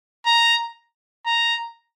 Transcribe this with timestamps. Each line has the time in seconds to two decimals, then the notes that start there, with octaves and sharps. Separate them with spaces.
0.26 A#5
1.27 A#5